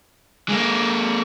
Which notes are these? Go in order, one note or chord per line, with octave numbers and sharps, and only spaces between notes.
G#3 A#3